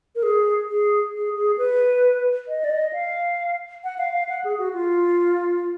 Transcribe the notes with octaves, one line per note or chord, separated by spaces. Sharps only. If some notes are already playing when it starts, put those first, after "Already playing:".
A#4
G#4
G#4
G#4
G#4
B4
D#5
D5
D#5
F5
F#5
F5
F5
F#5
G#4
F#4
F4